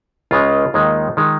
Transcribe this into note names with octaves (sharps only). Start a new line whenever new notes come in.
C#2 C#3 G#3 F4
D#2 D#3 G#3
D#3 G#3